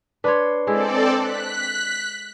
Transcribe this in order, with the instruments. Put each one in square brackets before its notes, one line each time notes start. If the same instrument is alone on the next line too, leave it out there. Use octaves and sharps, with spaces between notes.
[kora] D4 C#5 [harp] B4 B5 C6
[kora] G#3 E4 [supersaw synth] C4 A4 D5
[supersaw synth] F#6 B6